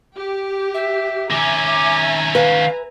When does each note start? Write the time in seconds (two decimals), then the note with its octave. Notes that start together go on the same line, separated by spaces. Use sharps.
0.17 G4
0.74 E5
1.31 D#3 C#4 E5 G#5 A#5 D6
2.35 B4 F5